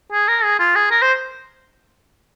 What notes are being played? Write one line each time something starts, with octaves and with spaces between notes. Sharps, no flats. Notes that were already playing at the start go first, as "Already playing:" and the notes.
G#4
A#4
G#4
F4
G#4
A#4
C5